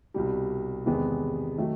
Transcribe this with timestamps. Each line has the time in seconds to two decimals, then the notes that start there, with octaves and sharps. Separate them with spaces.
0.14 C2 B2 G3
0.86 E2 C3 D#3 G#3 B3
1.58 D#3 F#3 A3